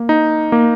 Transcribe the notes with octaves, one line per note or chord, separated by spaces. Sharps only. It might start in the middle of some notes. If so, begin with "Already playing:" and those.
Already playing: A#3
D#4
A#3